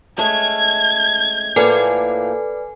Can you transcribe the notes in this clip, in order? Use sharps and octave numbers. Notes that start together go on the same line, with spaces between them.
G#3 A3 C#4 G#6
A2 F3 A#3 A4 B4 D5 G#5